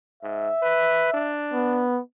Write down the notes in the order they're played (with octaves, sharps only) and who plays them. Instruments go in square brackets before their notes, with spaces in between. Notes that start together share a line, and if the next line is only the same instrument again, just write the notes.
[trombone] G#2 [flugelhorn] E5
[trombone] B4
D4
[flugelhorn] B3